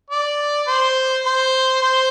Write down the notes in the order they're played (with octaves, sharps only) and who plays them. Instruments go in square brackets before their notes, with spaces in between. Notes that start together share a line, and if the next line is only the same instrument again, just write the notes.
[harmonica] D5
C5
C5
C5